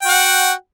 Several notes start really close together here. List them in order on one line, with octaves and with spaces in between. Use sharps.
G5 F#4 F#5